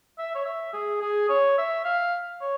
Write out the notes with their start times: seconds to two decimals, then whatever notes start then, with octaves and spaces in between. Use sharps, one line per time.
0.18 E5
0.35 C#5
0.45 E5
0.73 G#4
1.01 G#4
1.29 C#5
1.58 E5
1.85 F5
2.41 C#5